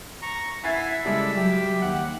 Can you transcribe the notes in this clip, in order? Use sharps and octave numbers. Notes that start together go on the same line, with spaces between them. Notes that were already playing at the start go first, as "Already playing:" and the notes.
A#5 C#6
E4 E5 F#5 G#5 G#6 A6 C7
C#3 G3 G#3 E4 A4 D5
F#3 G4
D#2 F#5